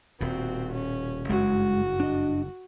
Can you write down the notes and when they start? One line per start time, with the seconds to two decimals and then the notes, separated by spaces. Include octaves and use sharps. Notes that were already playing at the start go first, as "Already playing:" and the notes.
0.21 D#1 B2 C4 F#4
0.74 C#4
1.29 F#1 G2 G#3 F#4
2.00 D4 D#5